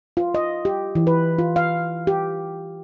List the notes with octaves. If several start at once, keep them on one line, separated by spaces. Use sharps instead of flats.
F4
D#5
G4
E3
B4
F4
F5
G4